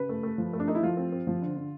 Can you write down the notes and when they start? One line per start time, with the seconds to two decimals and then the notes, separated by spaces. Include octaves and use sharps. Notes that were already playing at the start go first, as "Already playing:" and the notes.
Already playing: C#3 B4
0.09 A3
0.23 A3
0.38 F3
0.53 A3
0.60 D4
0.68 A3 D#4
0.75 E4
0.83 F3 F4
0.97 C4
1.12 C4
1.27 F3
1.42 D3
1.57 D3